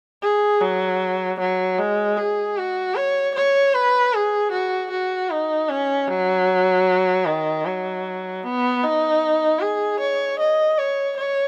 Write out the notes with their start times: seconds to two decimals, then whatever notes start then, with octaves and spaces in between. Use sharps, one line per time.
0.23 G#4
0.61 F#3
1.40 F#3
1.78 G#3
2.17 G#4
2.57 F#4
2.96 C#5
3.35 C#5
3.74 B4
4.13 G#4
4.52 F#4
4.91 F#4
5.31 D#4
5.69 C#4
6.08 F#3
7.26 D#3
7.66 F#3
8.43 B3
8.83 D#4
9.61 G#4
10.00 C#5
10.39 D#5
10.78 C#5
11.17 C#5